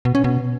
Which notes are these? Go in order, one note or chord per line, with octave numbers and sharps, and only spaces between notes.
B2
C#4
B2